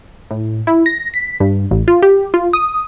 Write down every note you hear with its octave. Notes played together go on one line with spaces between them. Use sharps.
A2
E4
A#6
B6
G2
A1
F4
G4
F4
D#6